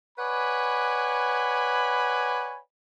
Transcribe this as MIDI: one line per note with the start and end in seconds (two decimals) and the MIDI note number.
0.19 2.58 71
0.19 2.58 73
0.19 2.58 74
0.19 2.58 78
0.19 2.58 80
0.19 2.58 83